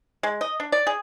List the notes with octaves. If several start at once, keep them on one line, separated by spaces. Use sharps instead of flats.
G#3
D#5
D4
D5
G#4